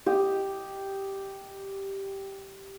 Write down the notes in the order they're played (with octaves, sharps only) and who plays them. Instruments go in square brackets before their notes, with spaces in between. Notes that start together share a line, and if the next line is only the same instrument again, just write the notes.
[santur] G4 D#5